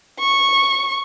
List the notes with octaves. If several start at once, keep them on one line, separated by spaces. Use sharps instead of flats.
C#6